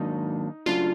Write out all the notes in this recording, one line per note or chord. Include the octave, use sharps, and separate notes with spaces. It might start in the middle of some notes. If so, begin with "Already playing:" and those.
Already playing: G#2 D#3 F#3 A#3 D4 D#4
C#3 F#3 A3 D4 F4